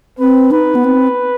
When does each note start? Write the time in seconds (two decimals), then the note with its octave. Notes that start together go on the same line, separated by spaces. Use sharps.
0.19 C4 B4
0.51 D#4 B4
0.75 B3
0.84 C4